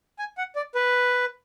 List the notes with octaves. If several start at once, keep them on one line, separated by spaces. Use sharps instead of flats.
G#5
F#5
D5
B4